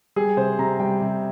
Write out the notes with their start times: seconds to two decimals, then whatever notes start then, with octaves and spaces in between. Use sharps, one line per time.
0.16 G3 G#4
0.37 C3 C5
0.59 C3 A#5
0.80 G3 G5
1.01 C3